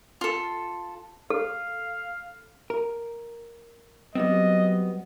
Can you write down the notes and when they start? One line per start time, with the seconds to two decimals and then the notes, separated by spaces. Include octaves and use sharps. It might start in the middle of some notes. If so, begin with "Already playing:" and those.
0.21 F4 A4
1.30 A4 F5
2.70 A#4
4.15 F#3 G3 B3 C4 D#5